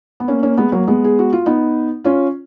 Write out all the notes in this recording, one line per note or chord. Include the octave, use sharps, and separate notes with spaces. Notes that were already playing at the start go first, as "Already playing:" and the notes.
B3
A#3 C#4
A#3 C#4
G#3 B3
F#3 A#3
G#3 B3
G#4
F#4
F4
B3 D#4
C#4 F4